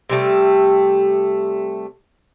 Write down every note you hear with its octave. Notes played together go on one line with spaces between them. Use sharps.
C3 G3 A3